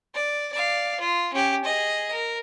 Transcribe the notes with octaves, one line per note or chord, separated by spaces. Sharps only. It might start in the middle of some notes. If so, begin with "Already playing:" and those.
D5
D5 F5
F4
C#4 G4
G#4 D#5
A#4